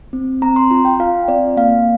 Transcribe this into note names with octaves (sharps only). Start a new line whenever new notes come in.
C4
C4 A#5
C6
F4 A#5
G5
F4 F5
C4 D5
A#3 F5